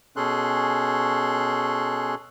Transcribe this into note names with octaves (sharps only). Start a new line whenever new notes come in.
B2 C#4 G#4 A4 C6 F#6